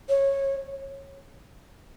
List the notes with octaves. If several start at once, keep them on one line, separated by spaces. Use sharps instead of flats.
C#5